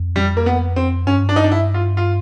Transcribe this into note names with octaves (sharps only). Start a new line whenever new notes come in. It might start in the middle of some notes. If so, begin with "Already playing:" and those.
Already playing: F2
G3
A#3
B3
C4
G2 C#4
D4
D#4
D4
E4
F4
F4